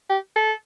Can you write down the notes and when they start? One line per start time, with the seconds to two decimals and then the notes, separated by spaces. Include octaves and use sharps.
0.09 G4
0.36 A4